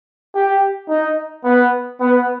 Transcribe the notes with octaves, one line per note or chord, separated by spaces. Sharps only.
G4
D#4
B3
B3